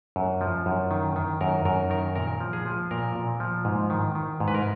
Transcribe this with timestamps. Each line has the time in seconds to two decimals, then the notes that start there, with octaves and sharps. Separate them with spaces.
0.16 F#2
0.41 F3
0.66 F#2
0.91 D#3
1.16 D#3
1.41 F#2 A#4
1.65 F#2 A#4
1.90 D#3 A#4
2.16 A#2 A#4
2.41 F3
2.53 G#4
2.66 F3
2.91 A#2 A#4
3.15 A#2
3.40 F3
3.65 G#2
3.90 D#3
4.15 D#3
4.40 G#2
4.48 B4
4.55 A#4